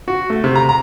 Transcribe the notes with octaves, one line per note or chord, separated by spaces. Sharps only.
F#4
A3
C3
A#5
A#5